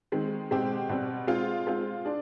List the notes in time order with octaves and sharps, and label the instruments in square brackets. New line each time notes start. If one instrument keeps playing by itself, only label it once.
[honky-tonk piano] D#3 G#3 C4
B2 G#3 C4 G4
B2 G3 C4
G#3 C4 F4 G#4
G#3 C4 F4
D4 G#4